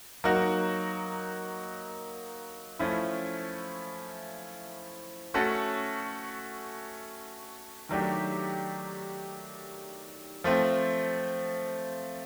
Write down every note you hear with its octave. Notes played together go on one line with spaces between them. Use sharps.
F#3 A#3 D#4 F#4
F3 A3 C#4 E4
A3 C#4 F#4 A4
D#3 F#3 A3 D4 G4
F3 A3 C4